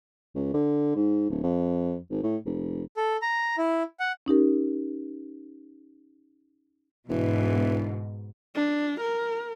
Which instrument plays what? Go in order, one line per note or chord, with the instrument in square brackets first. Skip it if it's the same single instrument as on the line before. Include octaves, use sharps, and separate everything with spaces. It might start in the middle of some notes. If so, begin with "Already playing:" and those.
[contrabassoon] C#2
D3
G#2
D1
F2
G#1
A2
F1
[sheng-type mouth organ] A4
A#5
E4
F#5
[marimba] C#4 D#4 G4 A#4
[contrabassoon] E1 [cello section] G#2 B2 [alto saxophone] E3
[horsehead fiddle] D4
A#4